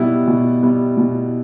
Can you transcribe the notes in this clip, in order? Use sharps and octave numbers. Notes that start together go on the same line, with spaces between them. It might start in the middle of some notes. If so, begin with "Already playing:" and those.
Already playing: B2 G3 B3 E4
B2
G3 B3 E4
B2